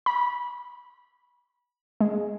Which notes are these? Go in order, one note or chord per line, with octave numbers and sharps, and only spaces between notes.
B5
G#3